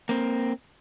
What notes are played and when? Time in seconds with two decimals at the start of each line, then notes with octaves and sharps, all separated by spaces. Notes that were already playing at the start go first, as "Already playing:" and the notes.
0.09 A#3 C4